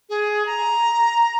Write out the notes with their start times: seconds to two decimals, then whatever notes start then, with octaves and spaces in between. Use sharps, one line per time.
0.09 G#4
0.46 A#5